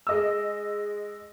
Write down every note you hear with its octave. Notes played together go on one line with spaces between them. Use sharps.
G#3 D#5 E6